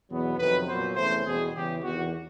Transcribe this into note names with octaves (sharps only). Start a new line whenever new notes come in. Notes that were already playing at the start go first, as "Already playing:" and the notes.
E2 B2 F#3 B3
F2 C3 D#3 F#3 B4
A#2 F#3 B3 C5
E2 C3 E3 A3 C#4 C5
E2 B2 G3 G#4
E2 C#3 E3 G4
E2 C3 D#3 F#4